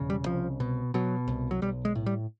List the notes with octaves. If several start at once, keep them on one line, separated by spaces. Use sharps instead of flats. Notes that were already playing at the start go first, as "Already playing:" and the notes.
Already playing: E1 C#3
G3
C2 F3
B2
B2 F#3
C2
F#3
B1 G3
G#3
A2
G3